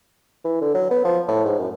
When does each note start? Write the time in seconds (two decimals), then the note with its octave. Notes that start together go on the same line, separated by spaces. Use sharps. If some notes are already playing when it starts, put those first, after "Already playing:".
0.45 E3
0.61 D3
0.74 F#3
0.91 B3
1.05 F3
1.28 A2
1.45 G#2
1.59 F#2